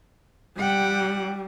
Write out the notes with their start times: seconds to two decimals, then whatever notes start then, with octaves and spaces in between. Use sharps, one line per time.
0.58 G3 F#5 G5